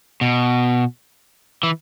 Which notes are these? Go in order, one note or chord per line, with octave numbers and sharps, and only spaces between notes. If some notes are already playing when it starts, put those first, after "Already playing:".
B2
E3